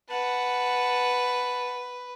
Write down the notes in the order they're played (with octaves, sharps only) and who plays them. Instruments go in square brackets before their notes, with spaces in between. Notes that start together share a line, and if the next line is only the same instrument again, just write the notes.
[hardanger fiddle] B4 [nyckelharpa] F#5 A5